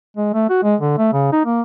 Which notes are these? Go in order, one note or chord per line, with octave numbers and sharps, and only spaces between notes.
G#3
A3
F#4
G#3
D3
A3
C#3
D#4
A#3